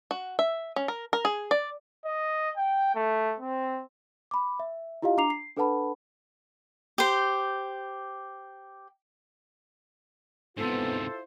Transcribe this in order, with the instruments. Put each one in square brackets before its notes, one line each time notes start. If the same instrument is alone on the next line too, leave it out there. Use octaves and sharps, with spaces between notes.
[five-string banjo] F#4
E5
C#4
A#4
A#4
G#4
D5
[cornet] D#5
G5
A3
C4
[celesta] B5 D6
E5
E4 F4 G4 D#5 F5
D4 A#5 D6 C7 F7
C7
D4 A4 B4 F#5 A5 B5
[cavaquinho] G4 C5
[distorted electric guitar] G#2 C3 [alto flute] B3 [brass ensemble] E4 F4 C5 [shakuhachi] A4